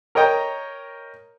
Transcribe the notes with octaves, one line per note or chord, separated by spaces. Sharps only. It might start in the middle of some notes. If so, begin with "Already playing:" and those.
A#4 C#5 D#5 G5 A#5